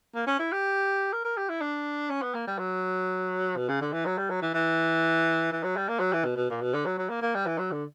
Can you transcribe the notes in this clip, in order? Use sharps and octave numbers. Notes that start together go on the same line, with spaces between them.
A#3
C#4
E4
G4
A#4
A#4
G4
E4
D4
C#4
B3
A#3
G3
F#3
B2
C#3
D3
E3
F#3
G3
F#3
E3
E3
E3
F#3
G3
A#3
F#3
E3
B2
B2
A#2
B2
D3
F#3
F#3
A#3
A#3
G3
E3
F#3
D3